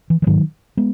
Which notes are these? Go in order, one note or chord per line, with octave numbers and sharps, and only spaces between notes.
E3
E3
G#2 D#3 F#3
G#3 B3